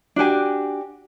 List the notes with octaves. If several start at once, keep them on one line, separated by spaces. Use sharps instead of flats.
D4 F#4 G4 G#5